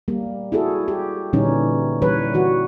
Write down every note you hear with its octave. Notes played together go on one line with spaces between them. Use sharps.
G3 A#3
E4 F#4 G#4 A4
G4
A#2 D3 E3 G3 C#4 D#4
E3 G3 B4 C#5
E3 F#4